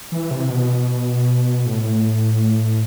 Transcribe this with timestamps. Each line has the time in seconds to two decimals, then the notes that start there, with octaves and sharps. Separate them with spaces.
0.12 E3
0.31 C3
0.50 B2
1.66 A2